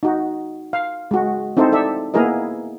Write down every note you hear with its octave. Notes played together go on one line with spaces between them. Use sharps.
D#4 F#4
F5
G#3 F#4
C4 D#4 E4 A4 C5
A4 D5 E5
A#3 B3 E4 G#4 A#4 D#5